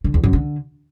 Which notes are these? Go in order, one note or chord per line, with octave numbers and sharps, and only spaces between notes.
D3
E2
F#2
D3